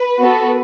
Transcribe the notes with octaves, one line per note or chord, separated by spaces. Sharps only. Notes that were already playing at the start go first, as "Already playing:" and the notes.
Already playing: B4
B3 F#4 A4